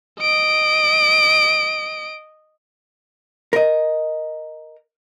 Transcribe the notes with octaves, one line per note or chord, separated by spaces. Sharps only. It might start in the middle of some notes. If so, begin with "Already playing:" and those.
D#5 D7
A#4 D#5